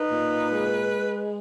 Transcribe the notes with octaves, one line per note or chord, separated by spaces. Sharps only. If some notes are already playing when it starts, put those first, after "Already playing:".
Already playing: D#4 B4
A#2
G#3